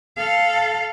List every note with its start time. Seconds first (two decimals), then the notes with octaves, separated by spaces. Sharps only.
0.17 A4 F5